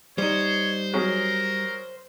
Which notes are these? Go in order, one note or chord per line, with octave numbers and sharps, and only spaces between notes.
G3 D#4 C5 C#5
F#3 G#4 A#4